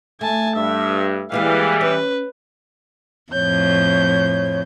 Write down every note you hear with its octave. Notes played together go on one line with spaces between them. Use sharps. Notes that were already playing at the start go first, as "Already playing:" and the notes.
A3 G#5 A5
G2 E5
E3 G3 G#3 A#3 G#4 F5
C#4 B4
F2 A2 C#5 G6